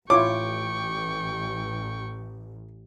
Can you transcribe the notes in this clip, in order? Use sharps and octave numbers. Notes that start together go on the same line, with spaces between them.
A1 E4 F4 C#5 G5 C#6 D6